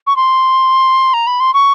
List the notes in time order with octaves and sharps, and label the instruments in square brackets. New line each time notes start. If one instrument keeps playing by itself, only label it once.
[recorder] C#6
C6
A#5
B5
C6
C#6